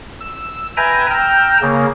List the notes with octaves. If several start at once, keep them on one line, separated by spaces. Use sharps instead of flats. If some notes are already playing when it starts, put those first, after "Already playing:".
E6
B4 E5 G5 G#5 A#5 A#6
G5 A#5 E6 F6 G6
C#3 A#3